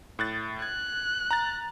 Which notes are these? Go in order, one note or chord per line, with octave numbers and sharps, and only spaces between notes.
A2 F#6 A6
F#6 G#6
A#5 A6